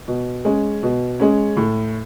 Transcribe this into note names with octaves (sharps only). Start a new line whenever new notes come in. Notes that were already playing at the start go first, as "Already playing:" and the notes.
B2
G#3 C#4
B2
G#3 C#4
A2